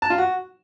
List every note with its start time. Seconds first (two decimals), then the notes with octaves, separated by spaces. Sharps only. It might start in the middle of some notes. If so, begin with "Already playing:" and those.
0.02 A5
0.10 F4
0.18 F#4